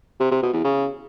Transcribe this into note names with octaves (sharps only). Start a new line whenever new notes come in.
C3
C3
B2
E2
C#3